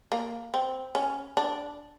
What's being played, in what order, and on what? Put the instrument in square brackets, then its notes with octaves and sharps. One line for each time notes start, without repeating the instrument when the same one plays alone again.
[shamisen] A#3
C4
C#4
D4